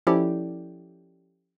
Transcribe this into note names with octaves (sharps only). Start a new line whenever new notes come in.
F3 C#4 E4 G4 A4 D5